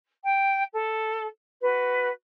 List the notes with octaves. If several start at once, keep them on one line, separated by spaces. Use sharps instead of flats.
G5
A4
F#4 B4